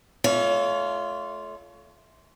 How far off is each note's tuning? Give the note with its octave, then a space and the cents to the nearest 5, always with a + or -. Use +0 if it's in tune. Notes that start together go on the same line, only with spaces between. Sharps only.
A3 -30 F4 -5 C#5 +30